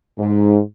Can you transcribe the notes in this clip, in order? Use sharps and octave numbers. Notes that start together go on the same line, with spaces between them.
G#2